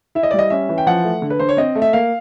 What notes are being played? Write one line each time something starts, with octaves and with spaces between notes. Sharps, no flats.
E4 E5
D#5
G3 D5
D#5
C#4 E5
E3
G5
F3 F#5
A3
D3
B4
D3 C5
C#5
C4 D#5
A3
E5
A#3 F5